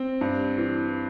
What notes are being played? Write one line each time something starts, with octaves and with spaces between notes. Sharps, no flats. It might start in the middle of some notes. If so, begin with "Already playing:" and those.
Already playing: C4
G2
E3